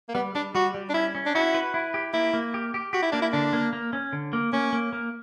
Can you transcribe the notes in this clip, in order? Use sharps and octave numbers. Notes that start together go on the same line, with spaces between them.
A#3
G3 B3
G3 D4
G3 F#4
G3
D4
C#4 E4
C#4
D4
E4 F#4
B4
E4
G4
A#3 E4
A#3
G4
G4
F#4 G4
E4
A#3 D4
E4
D3 D4
A#3
A#3
C#4
D3
A#3
A#3 C#4
A#3
A#3